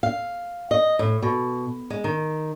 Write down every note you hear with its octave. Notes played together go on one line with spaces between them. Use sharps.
F5
D#5
A2
B2
G#3
D#3